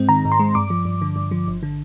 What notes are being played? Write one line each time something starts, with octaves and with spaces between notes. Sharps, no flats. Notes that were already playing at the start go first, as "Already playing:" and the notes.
Already playing: G#2 G#3 C4
D#3 A#5
G#2
C6
G#3
G2 D6
F3
G2
D3
G2
F3
G1
D3